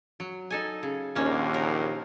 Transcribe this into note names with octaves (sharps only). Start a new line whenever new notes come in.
F#3
D#4 A4 G#5
C#3
A#1 D#2 A#3 C#4
A#4